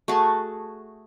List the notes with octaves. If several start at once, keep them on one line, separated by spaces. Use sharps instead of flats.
A3 F#4 G#4 A5